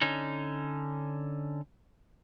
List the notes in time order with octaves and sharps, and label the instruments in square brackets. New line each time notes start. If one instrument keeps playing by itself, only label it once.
[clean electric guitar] D3 C#4 D#4